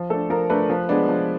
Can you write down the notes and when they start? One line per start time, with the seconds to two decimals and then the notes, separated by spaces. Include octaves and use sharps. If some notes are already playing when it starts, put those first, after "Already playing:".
Already playing: F3
0.10 A3 D4 A4
0.30 F3 A#4
0.50 A3 D4 B4
0.70 F3
0.89 G#3 B3 D4
1.09 F3